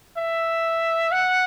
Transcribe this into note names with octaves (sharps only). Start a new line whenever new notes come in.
E5
F#5